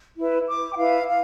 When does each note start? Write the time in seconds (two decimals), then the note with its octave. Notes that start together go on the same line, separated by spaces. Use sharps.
0.17 E4 B4
0.48 D6
0.72 G5
0.77 E4 B4 F5
1.07 F5